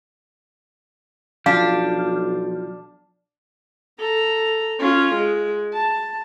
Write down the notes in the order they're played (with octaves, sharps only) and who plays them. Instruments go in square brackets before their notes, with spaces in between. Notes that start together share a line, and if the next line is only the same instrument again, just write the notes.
[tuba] B1 [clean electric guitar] F3 [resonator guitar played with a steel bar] D4 [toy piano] F5
[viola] A4 A#5
C#4 F4
G#3
A5